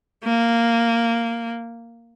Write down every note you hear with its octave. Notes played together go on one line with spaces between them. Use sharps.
A#3